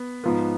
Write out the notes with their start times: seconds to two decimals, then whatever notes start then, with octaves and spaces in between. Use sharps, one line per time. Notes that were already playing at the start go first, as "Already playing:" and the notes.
Already playing: B3
0.24 G#2 F3 B3